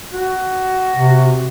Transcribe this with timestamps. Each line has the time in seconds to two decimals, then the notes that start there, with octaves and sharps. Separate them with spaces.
0.13 F#4
0.96 C3